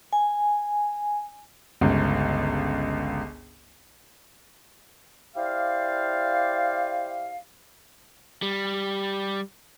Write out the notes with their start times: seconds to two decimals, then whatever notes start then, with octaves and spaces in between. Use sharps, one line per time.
0.13 G#5
1.81 G1 C#2
5.36 E4 G4 C5 D5 F5
8.42 G3